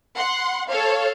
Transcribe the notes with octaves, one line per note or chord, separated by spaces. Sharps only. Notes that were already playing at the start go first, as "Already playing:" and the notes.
F#5 C6
A4 C#5 F5